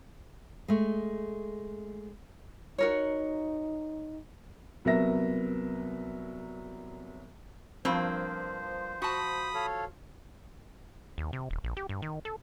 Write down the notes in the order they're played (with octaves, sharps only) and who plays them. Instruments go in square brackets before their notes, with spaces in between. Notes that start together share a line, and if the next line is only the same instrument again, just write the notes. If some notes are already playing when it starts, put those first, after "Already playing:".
[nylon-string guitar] G#3 A3
[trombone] D#4 [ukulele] F#4 A#4 C#5
[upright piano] C2 F#3 B3 A#4 E5 A#6
[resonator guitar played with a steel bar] G2 A#3 C4 [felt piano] F3 [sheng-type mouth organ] C5
[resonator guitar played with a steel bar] F#4 A5 [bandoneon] B5 D#6
[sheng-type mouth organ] A4 C#5 F5
[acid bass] D#2
C3
D#1
A#1
G4
G2
D#3
A4